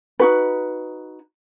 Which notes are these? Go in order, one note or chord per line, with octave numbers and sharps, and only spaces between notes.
D#4 F#4 B4